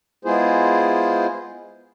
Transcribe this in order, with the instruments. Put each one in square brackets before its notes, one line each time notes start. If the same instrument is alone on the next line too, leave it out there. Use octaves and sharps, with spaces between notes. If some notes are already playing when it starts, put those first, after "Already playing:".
[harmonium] G#3 B3 E4 F4 G#4 C5